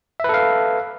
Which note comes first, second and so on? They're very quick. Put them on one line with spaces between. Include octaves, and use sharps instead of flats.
E5 B4 A4 F5